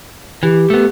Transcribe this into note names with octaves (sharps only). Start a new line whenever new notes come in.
E3 G4
A3 B3